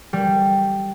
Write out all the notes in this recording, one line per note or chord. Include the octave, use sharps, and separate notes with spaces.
G3